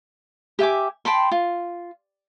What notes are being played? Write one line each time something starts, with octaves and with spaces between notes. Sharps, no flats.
G4 E5 G#5 D6
G5 A5 B5 C6
F4